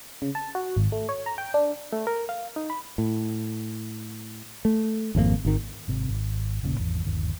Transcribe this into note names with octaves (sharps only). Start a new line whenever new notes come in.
C#3
A5
F#4
G#1
A3
C#5
A#5
G5
D4
A3
A#4
F5
D#4
B5
A2
A3
G#1 F2 B2 A#3
G#1 D#3
G#1 C3
G#1
E1 A1 A#2 C#3
G#1 E2
G1 D#2